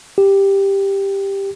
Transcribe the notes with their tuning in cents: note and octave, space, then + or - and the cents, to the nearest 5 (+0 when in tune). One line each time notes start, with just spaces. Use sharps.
G4 +5